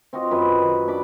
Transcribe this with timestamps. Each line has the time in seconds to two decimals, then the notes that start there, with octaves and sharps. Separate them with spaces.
0.13 C4 F4 F#4 D#5
0.31 F#2 B4 G#5
0.61 D#3
0.87 D4 D5 B5 D6